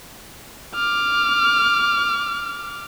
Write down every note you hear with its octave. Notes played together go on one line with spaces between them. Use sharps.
D6 F6